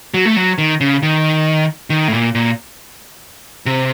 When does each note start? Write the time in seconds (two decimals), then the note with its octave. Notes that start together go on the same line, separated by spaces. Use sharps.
0.14 F#3
0.25 A3
0.36 F#3
0.58 D#3
0.80 C#3
1.03 D#3
1.90 D#3
2.08 A2
2.13 A#2
2.35 A#2
3.66 C3